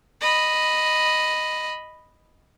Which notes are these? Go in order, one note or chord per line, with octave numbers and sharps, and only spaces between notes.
D#5 B5